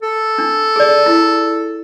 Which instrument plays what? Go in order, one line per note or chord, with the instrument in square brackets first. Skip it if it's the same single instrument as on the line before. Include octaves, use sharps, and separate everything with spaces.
[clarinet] A4
[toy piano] D4
G#4 D5
E4